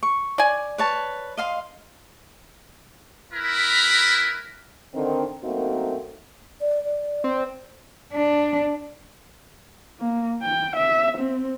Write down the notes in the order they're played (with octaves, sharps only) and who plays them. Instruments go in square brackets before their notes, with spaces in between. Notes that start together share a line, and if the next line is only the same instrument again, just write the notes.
[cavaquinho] C#6
[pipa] D5 G#5
[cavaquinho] B4 C#5 A5
D#5 F5 C6
[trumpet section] E4 A#4 B4
[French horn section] D3 D#3 C4
F#2 A3 A#3 C4 D#4 F#4
[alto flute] D5
D5
[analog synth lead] C4
[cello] D4
[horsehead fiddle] A#3
G5
E5
C4